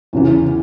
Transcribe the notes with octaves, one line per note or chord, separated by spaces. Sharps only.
E2 C#3 E3